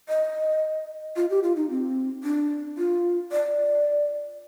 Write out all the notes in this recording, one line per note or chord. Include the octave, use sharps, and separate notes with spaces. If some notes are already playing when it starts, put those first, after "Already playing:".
D#5
F4
G4
F4
D#4
C4
D4
F4
D5